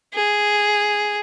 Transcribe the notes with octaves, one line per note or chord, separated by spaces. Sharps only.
G#4